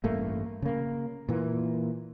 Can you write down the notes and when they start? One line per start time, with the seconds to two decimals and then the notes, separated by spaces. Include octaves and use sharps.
0.04 A1 G2 A3 A#3
0.62 C#3 A#3
1.29 A#2 E3 A#3